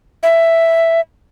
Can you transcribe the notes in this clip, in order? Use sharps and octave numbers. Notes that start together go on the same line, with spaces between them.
E5